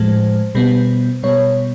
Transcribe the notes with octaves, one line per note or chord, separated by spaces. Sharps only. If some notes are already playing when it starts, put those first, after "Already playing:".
Already playing: A2 F3 G#3 C5
B2 G3 B3
B2 G3 B3 C#5